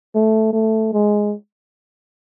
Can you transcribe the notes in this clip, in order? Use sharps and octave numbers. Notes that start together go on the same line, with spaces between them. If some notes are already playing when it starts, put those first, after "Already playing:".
A3
A3
G#3